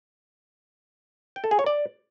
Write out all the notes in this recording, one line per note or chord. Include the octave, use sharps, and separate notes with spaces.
G5
A4
G#4
C#5
D5